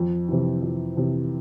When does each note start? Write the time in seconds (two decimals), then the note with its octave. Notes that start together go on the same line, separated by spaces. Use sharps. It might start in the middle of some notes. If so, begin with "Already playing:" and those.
Already playing: F2
0.29 C3 E3
0.63 F2
0.97 C3 E3